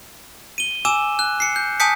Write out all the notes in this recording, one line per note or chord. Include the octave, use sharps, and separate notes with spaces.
D#7 G7
G#5 D6 E6 E7
F#6
C7 C#7
G6
G#5 A5 D#6 G6 B6 C#7